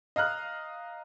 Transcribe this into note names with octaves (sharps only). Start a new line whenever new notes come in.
D#5 F5 A#5 F6 F#6